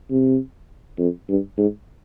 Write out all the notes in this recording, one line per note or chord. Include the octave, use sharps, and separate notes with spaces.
C3
F2
G2
G#2